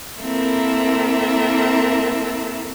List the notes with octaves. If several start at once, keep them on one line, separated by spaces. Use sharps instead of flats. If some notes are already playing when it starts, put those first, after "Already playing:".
A#3 C4 E4 A4 A#4 E5